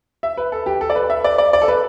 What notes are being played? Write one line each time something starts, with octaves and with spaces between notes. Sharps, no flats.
E5
B4
A4
G4
A4
D5
B4
E5
D5
D5
D5
A4
B4